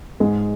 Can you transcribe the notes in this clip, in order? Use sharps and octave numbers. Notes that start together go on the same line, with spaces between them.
G#2 G#3